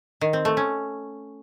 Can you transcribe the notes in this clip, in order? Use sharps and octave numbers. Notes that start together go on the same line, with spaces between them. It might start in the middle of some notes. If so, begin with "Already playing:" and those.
D#3
C4
A3
C#4